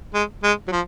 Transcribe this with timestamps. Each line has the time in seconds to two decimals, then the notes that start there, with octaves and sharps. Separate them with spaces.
0.14 G#3
0.43 G#3
0.68 F#3
0.72 F3